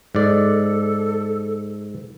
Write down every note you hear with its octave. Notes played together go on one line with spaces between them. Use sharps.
G#2 A4 D5